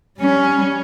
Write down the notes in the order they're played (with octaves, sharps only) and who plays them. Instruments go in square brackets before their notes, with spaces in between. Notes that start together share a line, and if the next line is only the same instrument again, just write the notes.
[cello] G3 C#4